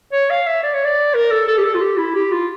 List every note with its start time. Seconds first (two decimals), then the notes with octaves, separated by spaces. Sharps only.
0.12 C#5
0.30 F5
0.47 E5
0.63 D5
0.74 C#5
0.84 D5
1.14 A#4
1.31 A4
1.47 A4
1.58 G4
1.64 A4
1.74 F4
1.81 G4
1.97 E4
2.15 G4
2.31 F4